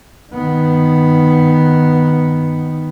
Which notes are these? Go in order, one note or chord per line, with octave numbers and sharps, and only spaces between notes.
D#3 B3